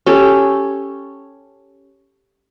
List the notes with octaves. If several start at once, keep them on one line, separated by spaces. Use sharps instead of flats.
C#4 G4 A4